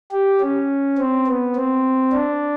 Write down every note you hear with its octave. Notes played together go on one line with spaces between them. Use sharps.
G4
C#4
C4
B3
C4
D4